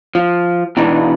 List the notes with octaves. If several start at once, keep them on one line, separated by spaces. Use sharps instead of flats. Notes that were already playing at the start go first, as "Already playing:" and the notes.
F3
B2 E3 D4 D#4